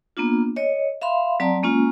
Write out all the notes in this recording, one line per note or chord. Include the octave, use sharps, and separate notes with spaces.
A#3 B3 D4 F4
C#5 D#5
E5 F5 B5 C6
F#3 C4 D5 A5 A#5
G#3 A#3 C#4 F4